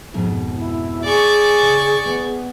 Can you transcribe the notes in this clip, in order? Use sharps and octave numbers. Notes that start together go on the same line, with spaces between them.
F2 G#2 B2
E4
G#4 D5 C#6
C#3
B3